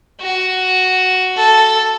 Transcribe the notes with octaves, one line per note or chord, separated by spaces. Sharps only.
F#4
A4